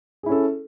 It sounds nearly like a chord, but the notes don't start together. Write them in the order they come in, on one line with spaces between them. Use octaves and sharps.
G#4 E4 C#4 A4